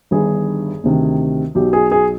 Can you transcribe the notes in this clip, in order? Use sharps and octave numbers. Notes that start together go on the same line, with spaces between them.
G1 G2 D#3 G#4
D2 C3 D#3
B1 B2 G4
G#4
G#4